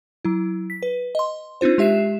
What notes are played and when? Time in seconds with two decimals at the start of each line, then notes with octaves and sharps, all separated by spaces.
0.25 F#3 E4
0.70 B6
0.83 B4
1.15 D#5 C6
1.61 C4 D4 D#4 F4 C5
1.78 G#3 G4 E5 C7 E7